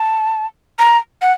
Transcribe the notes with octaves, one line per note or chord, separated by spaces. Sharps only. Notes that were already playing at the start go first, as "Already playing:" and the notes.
Already playing: A5
A#5
F#5